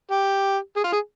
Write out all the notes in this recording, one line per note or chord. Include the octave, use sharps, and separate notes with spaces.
G4
G#4
F4
G#4